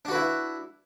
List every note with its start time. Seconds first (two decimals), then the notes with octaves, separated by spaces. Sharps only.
0.05 D4
0.08 F#4
0.11 B4
0.15 E4